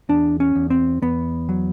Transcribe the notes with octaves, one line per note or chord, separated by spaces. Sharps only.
E2 D4
C#4
E2
C4
E2 B3
F#3